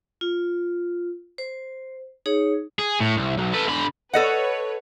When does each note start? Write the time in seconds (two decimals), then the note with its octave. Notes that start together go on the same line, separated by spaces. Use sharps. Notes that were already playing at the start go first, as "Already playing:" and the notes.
0.21 F4
1.38 C5
2.26 D#4 G#4 C#5
2.78 G#4
3.00 A2
3.17 C2
3.38 B1
3.54 A4 B4
3.69 D3 B5
4.13 A4 B4 C#5 D#5 F#5